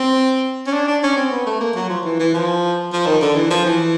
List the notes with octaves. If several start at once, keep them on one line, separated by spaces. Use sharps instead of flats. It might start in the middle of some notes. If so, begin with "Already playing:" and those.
Already playing: C4
C#4
D4
D4
C#4
C4
B3
A3
A#3
F#3
F3
E3
E3
F3
F3
D#3
D3
E3
F3
E3